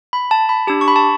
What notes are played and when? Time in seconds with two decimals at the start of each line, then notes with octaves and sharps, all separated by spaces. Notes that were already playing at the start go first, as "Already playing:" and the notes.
0.13 B5
0.31 A5
0.49 B5
0.67 D4 G4 A5
0.81 C#6
0.88 B5
0.96 A5